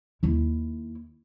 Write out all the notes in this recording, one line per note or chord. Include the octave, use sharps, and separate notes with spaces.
D#2 E4